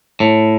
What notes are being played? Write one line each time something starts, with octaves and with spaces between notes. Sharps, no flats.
A2